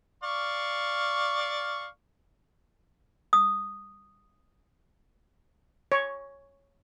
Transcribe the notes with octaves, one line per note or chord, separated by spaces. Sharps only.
D5 F5 C#6
D#6
C#5